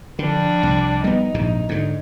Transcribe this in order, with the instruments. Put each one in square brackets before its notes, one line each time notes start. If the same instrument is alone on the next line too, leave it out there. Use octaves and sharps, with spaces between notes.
[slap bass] D3 [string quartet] F3 G3 D4
[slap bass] C2
[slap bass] G3 B3 [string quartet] D#4
[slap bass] A#1 G#2 C3
G#2 D3